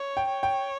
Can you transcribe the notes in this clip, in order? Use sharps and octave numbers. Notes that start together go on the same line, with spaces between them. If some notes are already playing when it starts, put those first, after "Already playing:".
Already playing: C#5
G5
C#5
G5